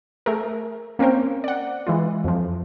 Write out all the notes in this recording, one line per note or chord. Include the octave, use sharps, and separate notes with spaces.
A3 G#4 A#4
A#3 C4 C#4 A#4 C5
D5 F#5
E3 G#3 F4
F2 F3